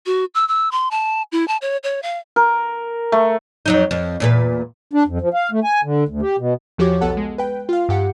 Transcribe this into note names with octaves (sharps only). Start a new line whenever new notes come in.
F#4
E6
E6
C6
A5
E4
A5
C#5
C#5
F5
A#4
A3
F2 F#3 D#4
F2
E2 A#2 B4
D4
F2
F3
F5
A3
G#5
D3
D2
G4
B2
E2 F3 F#4 G4 C#5 D6
B1 B3 A4 F#5 A5
G#3
B4 G5
F4 F5
G2 G4 F#5 C#7